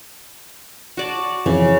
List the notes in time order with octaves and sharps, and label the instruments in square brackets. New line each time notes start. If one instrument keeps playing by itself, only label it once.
[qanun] F#4 D5 A5
[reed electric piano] F2 E3 [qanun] C#3